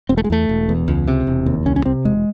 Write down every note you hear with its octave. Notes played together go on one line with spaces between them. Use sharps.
E1 C4
A3
G#3
E2 A3
E1
E2
C#2
C3
E1
D#2
C2 C#4
C#4
C3 C4
E1 G#3